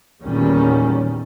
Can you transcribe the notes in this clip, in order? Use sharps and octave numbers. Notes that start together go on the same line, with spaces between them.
E2 A#2 D#3 G3 C#4